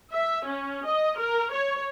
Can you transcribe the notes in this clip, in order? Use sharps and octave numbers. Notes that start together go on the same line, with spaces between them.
E5
C#4
D#5
A#4
C#5